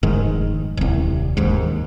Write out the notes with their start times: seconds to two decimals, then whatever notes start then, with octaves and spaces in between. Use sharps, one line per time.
0.03 F1 G#2 D#3
0.77 D#1 C2
1.37 E1 D#2 G#2